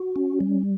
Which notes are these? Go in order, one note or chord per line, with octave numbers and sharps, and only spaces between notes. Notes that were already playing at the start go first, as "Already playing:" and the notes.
Already playing: F#4
C#4
G3